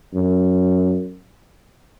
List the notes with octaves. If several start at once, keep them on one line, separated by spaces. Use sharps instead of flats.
F#2